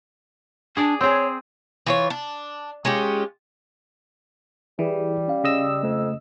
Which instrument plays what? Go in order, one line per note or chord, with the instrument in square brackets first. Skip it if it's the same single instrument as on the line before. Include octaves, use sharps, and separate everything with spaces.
[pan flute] D4 [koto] G#4 D5
[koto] C4 G#4 [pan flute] C#5
[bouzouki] E3 F4 C#5
D4
G#3 C#4 F4 G4
[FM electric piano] E3 [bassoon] G3 [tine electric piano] E4 G4 G#4
[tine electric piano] C#4 F5
[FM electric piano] C#3 D#5 E6
[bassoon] F2 [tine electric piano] A3